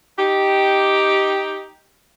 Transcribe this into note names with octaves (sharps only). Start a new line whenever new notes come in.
D#4 G4